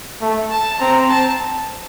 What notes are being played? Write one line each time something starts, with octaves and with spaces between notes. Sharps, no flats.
A3
A5
C4 A#5
A5